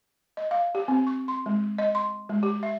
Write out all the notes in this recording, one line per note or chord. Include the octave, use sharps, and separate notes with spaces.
D#5
F5
G4
C4
C#6
C6
G#3
D#5
C6
G#3
G4
E5